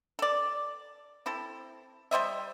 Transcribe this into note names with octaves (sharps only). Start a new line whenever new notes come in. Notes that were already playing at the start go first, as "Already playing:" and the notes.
A4 D5
C4 E4 A4
G3 C5 D#5 E5